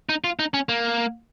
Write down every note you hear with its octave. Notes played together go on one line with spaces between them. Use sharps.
D#4
F4
D#4
C#4
A#3